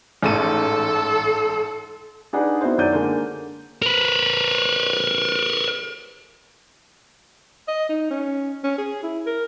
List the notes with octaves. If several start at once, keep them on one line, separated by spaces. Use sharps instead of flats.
A1 G#2 A4 D#7
D4 D#4 G#4 B4 F#5
B3 E4 F#4 C5
F#2 D#3 F#3 D5 G6 D#7
D3 G#3 A#3 D4
A#4 B4
D#5
D#4
C#4
C#4
G#4
E4
A#4